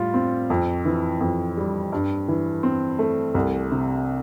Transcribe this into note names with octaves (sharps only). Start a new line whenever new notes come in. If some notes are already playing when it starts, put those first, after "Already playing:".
Already playing: A2 G3 F4
C4
F2
E3
F2
G3
G2
E3
C4
A3
C2
C3